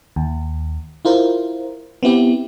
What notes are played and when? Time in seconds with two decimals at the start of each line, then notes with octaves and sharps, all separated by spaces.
0.16 D#2
1.05 E4 F4 A#4 C5
2.03 B3 C4 E4 G4